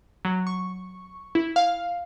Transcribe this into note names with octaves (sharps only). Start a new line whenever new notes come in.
F#3
C#6
E4
F5